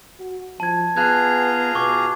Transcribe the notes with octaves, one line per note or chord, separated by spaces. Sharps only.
F#4
F3 A5 G#6
B3 F4 G#4 A5 A#5 F#6 G#6
B2 C#6 D6